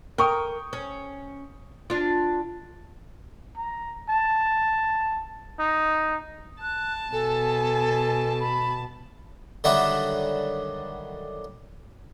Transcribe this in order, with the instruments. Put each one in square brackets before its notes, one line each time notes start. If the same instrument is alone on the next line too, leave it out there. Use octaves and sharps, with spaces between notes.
[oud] A#4 [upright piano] G5 C#6 D#6
[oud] C#4
D4 F4
[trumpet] A#5
A5
D#4
[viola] A5 [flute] F#6
[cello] B2 [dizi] A4 [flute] G#5
[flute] B5
[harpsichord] D3 D#3 F#3 G3 E5 F#5